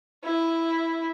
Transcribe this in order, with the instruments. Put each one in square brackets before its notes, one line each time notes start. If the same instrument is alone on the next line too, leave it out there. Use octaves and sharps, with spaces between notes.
[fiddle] E4